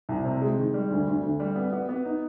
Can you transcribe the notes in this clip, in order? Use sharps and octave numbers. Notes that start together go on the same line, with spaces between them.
C2
C3
G#3
D#3
G3
D2
D2
D2
G3
B3
B3
B3
D#4